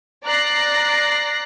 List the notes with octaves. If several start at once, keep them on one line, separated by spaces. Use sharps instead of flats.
D5 A#5 F#6 A#6 C7